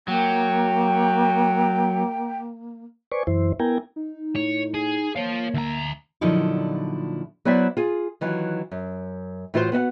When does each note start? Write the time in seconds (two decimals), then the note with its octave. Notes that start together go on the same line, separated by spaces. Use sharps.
0.08 F#3 A#3 G5
3.12 B4 C5 D5 G#5 C#6
3.27 F#2 E3 E4 C5
3.60 B3 E4 A#4 G5 G#5 A#5
3.96 D#4
4.35 A2 C#5
4.74 G#4
5.16 A#3 C5 C#5 F5
5.54 D2 E5 A#5
6.21 A#2 D3 F3 F#3 D#4 E4
7.45 F#3 B3 E4 C5 D5 E5
7.77 F4 G#4
8.21 D#3 E3 F#3 F4
8.71 F#2
9.54 A2 E3 F4 F#4 B4 C5
9.72 B3 F#4 D#5 F#5